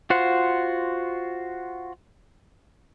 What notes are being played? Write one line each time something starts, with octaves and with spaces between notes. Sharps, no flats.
F4 F#4 C5 F#5